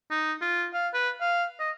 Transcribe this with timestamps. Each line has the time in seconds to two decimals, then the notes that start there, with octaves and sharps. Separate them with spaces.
0.10 D#4
0.41 F4
0.73 F5
0.94 B4
1.21 F5
1.59 D#5